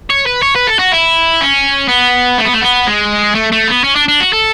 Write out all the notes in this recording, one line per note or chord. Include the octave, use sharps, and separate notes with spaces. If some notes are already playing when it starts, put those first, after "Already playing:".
C#5
B4
C#5
B4
A4
F#4
E4
C#4
B3
A3
B3
A3
B3
G#3
A3
A3
B3
C#4
D4
D4
F#4
A4